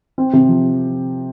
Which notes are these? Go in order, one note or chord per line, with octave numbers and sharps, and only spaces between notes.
C4
C3
F3